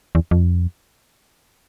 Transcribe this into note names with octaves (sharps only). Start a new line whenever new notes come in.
E2
F2